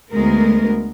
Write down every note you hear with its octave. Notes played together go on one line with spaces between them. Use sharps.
D2 G#3 B3 A#4